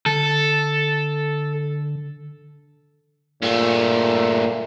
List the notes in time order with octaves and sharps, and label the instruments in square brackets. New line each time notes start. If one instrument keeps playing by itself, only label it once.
[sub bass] D3 [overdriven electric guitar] A4
[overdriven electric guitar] G2 A3 [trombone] A#2